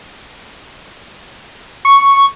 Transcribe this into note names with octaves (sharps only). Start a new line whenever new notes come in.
C#6